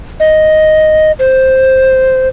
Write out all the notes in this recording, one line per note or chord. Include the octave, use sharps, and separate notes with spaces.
D#5
C5